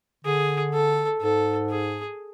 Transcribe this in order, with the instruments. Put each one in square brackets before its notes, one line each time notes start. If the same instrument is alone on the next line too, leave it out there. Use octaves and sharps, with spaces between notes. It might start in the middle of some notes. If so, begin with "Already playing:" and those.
[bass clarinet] D3 [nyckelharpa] G#4
[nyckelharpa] A4
[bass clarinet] G#2 [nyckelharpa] A4
[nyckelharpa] G#4